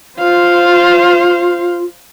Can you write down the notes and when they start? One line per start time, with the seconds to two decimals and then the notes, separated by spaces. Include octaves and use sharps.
0.18 F4 C5 F5